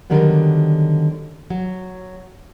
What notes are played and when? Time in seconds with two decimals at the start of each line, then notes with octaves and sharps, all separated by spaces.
0.10 D3 D#3 F#3 G3 B3
1.50 F#3